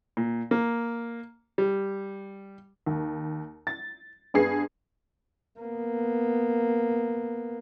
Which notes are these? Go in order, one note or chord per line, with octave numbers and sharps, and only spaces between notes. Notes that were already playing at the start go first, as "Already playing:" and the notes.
A#2
A#3
G3
D#2
A6
G2 B3 G#4 C7
A#3 B3